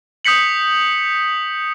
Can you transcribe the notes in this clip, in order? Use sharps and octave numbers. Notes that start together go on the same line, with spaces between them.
D#6 G6 B6 C#7 F#7